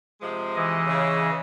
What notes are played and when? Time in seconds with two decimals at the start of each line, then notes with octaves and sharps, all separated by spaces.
0.21 C3 F3 G#3
0.56 E3 D#5
0.87 C#3